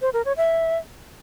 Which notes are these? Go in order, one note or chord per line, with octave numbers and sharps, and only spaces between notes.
C5
A#4
C#5
E5